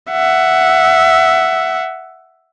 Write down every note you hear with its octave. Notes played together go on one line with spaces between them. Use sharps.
E5 F#5